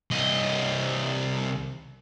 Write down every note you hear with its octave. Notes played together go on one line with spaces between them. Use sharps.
C2 D#5